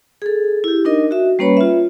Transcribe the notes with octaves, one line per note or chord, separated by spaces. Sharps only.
G#4 A4
E4 G4
D4 D#4 A#4 D#5
F#4 E5
G3 A#3 C#4 B4 C#5 B5
F4 E5